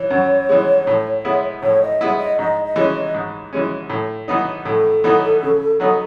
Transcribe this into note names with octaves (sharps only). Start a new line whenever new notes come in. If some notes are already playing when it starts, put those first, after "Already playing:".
Already playing: E3 C#5
F#2
E3 G#3
A2
G#3 B3 E4
A2 C#5
D#5
G#3 B3 E4
D#5
G#2 D#5
D#5
E3 G#3 C#4
D#5
G#2
E3 G#3 C#4
A2
E3 B3 D#4
A2 A4
E3 B3 D#4
C#3
F#3 B3 D#4